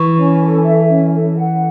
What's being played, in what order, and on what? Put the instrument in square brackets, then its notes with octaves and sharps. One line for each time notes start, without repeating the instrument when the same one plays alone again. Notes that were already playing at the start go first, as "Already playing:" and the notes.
Already playing: [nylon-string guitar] E3 [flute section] C#6
[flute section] C#4
A4
E5
C#4
A4
F#5